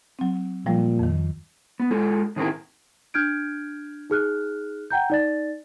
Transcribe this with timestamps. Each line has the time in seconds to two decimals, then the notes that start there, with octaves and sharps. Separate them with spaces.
0.19 F#3 C4
0.66 A#2 F3 G3 A3
0.99 F2 D#3
1.80 B3
1.91 G#3 F4 A4
2.36 A2 D#3 C4 D#4 E4 A#4
3.14 D4 F6 G6 G#6 D7
4.10 D#4 G#4 F6 F#6
4.91 F#5 G5 A#5 G6
5.10 D#4 D5 A6